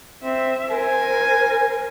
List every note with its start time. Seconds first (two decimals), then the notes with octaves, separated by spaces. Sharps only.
0.24 C4 E5
0.72 A#4 C5 G#5